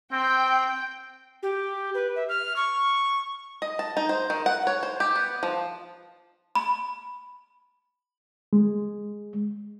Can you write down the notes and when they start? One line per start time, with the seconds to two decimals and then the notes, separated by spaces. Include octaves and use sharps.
0.12 C4 G5
1.43 G4
1.95 B4
2.16 E5
2.29 F6
2.56 C#6
3.62 D#5
3.79 A5
3.97 D#4
4.09 C5
4.30 D#3
4.46 F#5
4.67 C#5
4.83 C5
5.00 G4
5.16 B3
5.43 F3
6.55 B5
8.53 G#3